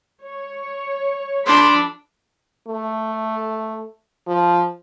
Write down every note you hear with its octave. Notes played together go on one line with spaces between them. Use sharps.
C#5
F3 D4 A4 B5 C6
A3
F3